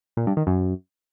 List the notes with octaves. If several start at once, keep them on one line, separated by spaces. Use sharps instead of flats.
A#2
G2
D#3
F#2